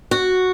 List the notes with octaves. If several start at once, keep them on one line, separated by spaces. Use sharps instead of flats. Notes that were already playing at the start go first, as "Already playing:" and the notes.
F#4